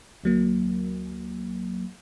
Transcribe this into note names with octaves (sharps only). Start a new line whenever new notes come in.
D2 F#3 A#3